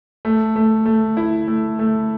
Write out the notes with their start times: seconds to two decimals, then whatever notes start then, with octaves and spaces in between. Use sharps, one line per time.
0.25 A3
0.56 A3
0.85 A3
1.17 E4
1.48 A3
1.79 A3